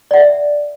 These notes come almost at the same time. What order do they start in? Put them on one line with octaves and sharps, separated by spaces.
D5 F#5 E5